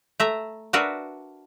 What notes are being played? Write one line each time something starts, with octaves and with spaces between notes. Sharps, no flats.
A3 E5 A#5
D4 F#4 A#4 B4 E5